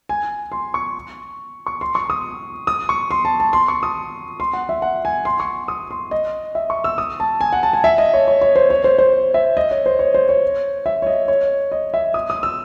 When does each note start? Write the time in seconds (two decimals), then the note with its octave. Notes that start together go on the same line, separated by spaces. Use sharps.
0.09 G#5
0.52 C6
0.74 C#6
1.67 C#6
1.81 C6
1.95 C#6
2.10 D#6
2.67 D#6
2.89 C#6
3.11 C6
3.25 A5
3.40 A5
3.53 C6
3.68 C#6
3.83 D#6
4.40 C6
4.53 F#5
4.69 E5
4.82 F#5
5.05 G#5
5.25 C6
5.40 C#6
5.68 D#6
5.91 C6
6.11 D#5
6.55 E5
6.70 C#6
6.84 E6
6.98 D#6
7.20 A5
7.41 G#5
7.53 F#5
7.63 A5
7.73 G#5
7.84 E5
7.98 D#5
8.14 C#5
8.28 C#5
8.41 C#5
8.56 C5
8.70 C#5
8.84 C5
8.99 C5
9.34 E5
9.57 D#5
9.71 C#5
9.86 C5
9.99 C#5
10.14 C5
10.29 C#5
10.86 E5
11.02 C#5
11.07 D#5
11.28 C#5
11.72 D#5
11.94 E5
12.14 D#6
12.30 D#6
12.43 E6